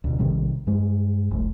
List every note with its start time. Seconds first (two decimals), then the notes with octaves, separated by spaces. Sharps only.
0.04 D2 B2
0.19 A#1 C3 D#3 G3
0.67 G2 G#3
1.31 F1 C2 A3